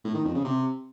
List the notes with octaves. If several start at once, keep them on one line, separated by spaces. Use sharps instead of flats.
A2
D#3
F2
C#3
C3